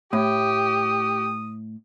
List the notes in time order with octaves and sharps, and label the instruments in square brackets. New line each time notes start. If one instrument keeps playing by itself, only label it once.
[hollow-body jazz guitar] A2 [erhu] G4 [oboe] D#6